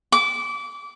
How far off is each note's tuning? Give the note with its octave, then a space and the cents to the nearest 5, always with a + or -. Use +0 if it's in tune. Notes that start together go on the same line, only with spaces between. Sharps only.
D6 -25